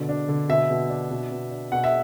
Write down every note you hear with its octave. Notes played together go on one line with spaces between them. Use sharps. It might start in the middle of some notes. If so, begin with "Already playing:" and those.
Already playing: B2 D3
D4
D3
B2 E5
B2
D4
B2
B2
D4
B2 F#5
E5